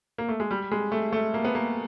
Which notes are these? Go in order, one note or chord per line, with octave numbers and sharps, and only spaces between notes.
A#3
A3
G#3
G3
G#3
A3
A3
A#3
B3
A#3